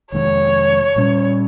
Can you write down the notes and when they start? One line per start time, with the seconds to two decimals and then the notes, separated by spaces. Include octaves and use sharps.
0.12 F2 C3 D#3 G#3 C#5
0.96 A#2 G3 C#4